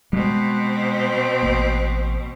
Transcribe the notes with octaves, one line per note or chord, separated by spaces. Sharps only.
B2 G3 G#3 C4
A1 A2 A#3